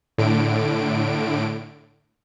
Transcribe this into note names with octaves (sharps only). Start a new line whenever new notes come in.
A2 D3 D7